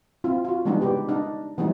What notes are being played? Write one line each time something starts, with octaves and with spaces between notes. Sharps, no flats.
C4 E4 F4
F4 F#4
E3 G3 G#3 B3 D4 D#4
C#3 D4 G4 B4
D4 D#4
E3 F#3 G3 A3 B3 D#4